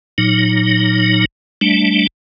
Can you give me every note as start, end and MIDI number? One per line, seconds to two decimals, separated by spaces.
0.18 1.25 46
0.18 1.25 54
0.18 1.25 63
1.61 2.07 55
1.61 2.07 57
1.61 2.07 62